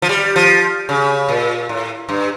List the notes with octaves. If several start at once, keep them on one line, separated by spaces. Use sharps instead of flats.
F3
G3
F3
C#3
A#2
A2
G2